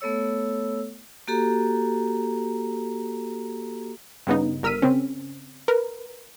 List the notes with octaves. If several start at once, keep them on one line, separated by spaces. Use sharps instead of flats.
A3 B3 A4 C#5 E6
A#3 F#4 G4 A4 A#5
G2 C#3 B3 D#4
G1 A#4 E6 F6 B6 D#7
C#3 C4 C#4
A#4 B4